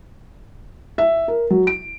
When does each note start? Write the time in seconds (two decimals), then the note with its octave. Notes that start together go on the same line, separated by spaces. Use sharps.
0.98 E5
1.28 A#4
1.50 F#3
1.67 D7